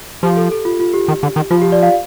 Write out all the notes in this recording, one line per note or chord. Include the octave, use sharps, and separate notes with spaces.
F3 G4
A4
A4
F4
F4
G4
D#3
D3
D#3
F3 F4
G4
D5
F5